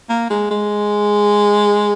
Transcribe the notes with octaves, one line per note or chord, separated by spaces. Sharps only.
A#3
G#3
G#3